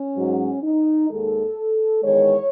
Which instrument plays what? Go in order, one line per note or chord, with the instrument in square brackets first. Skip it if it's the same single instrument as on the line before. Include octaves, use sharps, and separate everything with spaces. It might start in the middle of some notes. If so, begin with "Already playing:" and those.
Already playing: [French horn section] C#4
G#2 F#3
D#4
D#2 D#3 G#3 A4
E2 D#3 G#3 C#5